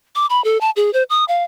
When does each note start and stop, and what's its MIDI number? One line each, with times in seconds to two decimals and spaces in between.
0.15 0.26 86
0.30 0.43 83
0.44 0.60 69
0.61 0.70 81
0.76 0.92 68
0.93 1.03 72
1.10 1.25 87
1.28 1.44 77